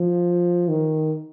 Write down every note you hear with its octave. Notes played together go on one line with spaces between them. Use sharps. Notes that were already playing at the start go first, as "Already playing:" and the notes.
Already playing: F3
D#3